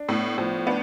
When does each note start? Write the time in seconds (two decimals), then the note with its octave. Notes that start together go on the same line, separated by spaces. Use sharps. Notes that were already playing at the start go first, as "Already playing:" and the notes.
Already playing: D4
0.09 A2 B3
0.38 A2 F3
0.67 B3 D4